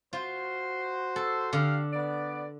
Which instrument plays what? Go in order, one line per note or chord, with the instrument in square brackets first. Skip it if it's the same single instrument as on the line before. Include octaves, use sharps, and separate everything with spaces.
[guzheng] F4 [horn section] F#4 C5
[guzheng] A4
[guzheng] D3 [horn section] G4 F5
[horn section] B3 D5